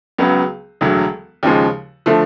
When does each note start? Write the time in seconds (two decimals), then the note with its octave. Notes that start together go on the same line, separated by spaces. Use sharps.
0.18 C#2 C#3 F#3 B3
0.81 E1 D2 D3 F#3
1.43 D#2 C#3 F3 G#3
2.06 D3 F3 A3